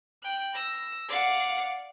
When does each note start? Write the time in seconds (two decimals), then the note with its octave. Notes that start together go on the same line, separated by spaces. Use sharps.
0.23 G5 F#6
0.55 E6 A#6
1.09 D5 F5 F#5